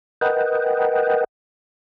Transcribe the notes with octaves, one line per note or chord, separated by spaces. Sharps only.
A#4 B4 D#5 F#5 G5